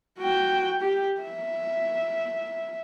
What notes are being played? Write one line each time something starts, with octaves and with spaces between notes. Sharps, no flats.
F#4 G5
G4
E5